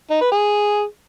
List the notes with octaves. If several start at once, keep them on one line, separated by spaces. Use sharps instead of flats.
D#4
B4
G#4